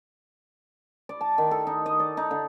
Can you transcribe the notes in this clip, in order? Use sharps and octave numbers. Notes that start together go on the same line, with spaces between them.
D5
A5
D#3
A4
D#4
D#5
D5
D#4
D3